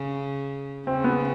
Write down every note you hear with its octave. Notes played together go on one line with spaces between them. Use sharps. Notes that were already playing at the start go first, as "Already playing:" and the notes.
Already playing: C#3
C#3 C4
B3